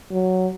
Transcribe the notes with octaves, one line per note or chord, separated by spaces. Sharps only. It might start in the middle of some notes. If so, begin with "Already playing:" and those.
F#3